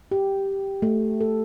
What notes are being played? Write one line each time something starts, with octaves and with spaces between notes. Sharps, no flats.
G4
A3
A4